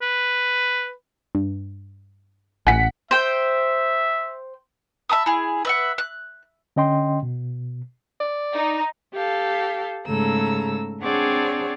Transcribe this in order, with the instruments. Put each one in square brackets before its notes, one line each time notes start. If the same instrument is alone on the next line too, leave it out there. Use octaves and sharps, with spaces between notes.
[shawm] B4
[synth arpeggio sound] G2
[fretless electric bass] A1 [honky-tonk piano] F#5 B6 [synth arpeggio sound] G#5
[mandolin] C5 G5 [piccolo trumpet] E5
[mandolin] E5 A5 B5 D#6
E4 G#4
B4 E5 F#5
F#6
[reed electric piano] D3 C#4 D#5 G5 C6
B2
[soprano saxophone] D5
[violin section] D#4
[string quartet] G4 A4 F5
G#2 C#3 A3 A4 A#5 E6
C4 D4 G#4 C#5 D5 F#5